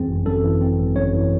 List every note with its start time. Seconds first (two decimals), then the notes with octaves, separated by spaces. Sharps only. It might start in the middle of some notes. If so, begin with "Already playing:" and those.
Already playing: F#2 E3 C4 G#4
0.08 G#1
0.26 F#2 A4
0.43 E3
0.61 C4
0.79 G#1
0.96 F#2 C#5
1.14 E3